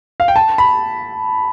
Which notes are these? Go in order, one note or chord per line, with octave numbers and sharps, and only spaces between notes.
F5
G5
A5
B5